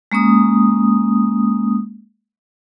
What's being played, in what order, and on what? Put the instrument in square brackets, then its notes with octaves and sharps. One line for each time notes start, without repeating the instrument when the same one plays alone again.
[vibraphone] G#3 A#3 C#4 D#6